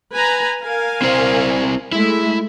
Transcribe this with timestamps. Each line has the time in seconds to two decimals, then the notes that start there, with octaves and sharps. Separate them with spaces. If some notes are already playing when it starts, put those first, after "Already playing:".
0.15 B4 G#5 A#5
0.63 A#4 F5 G#5
1.02 C4 E4 C5
1.92 G#3 A3 E4 E5